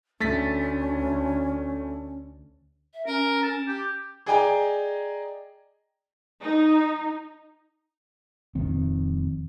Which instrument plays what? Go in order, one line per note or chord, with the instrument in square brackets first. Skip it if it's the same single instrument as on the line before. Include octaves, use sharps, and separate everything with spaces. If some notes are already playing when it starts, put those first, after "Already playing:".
[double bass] D2 [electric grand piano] A3 A6 B6 [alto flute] C#4
[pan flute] E5
[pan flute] C#4 [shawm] A#4
[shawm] A5
G4
[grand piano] G#4 D5 D#5 G5 G#5 A#5
[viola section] D#4
[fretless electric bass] D#1 F2 D#3 C4